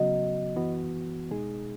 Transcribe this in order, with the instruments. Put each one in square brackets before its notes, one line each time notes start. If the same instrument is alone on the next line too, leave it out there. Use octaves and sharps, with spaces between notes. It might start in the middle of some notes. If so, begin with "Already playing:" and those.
Already playing: [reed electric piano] C#3 F#3 B3 F#4 [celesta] D#5
[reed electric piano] F#2 E3 B3 F#4
B2 G#3 D#4 G#4